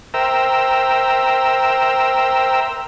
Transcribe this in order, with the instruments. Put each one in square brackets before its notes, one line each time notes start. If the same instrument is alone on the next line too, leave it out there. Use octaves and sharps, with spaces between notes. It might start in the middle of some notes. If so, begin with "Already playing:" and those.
[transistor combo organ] A#4 C5 E5 G5 A#5 E6